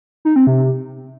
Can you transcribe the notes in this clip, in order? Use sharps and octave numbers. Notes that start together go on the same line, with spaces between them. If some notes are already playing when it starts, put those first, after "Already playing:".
D#4
C4
C3